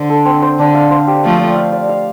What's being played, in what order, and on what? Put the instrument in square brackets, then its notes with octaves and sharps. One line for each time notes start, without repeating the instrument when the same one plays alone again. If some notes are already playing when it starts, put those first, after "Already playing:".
Already playing: [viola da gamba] D3 [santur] C5 D5
[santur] A4
C4
C5
[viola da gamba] D3 [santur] D4
[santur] F5
C5
G4
[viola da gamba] F3 A3 [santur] F5
[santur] D5
F5
D5
F5